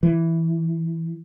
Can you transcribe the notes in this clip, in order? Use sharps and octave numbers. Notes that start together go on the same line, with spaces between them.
E3